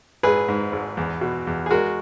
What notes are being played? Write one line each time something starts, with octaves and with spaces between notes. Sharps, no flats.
G#1 G#4 B4
G#2
G#1
E2
B2
E2
G#4
G#3 F#4 A#4